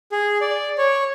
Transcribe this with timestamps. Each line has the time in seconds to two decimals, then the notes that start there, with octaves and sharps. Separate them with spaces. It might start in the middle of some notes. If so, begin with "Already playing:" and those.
0.12 G#4
0.41 D5
0.78 C#5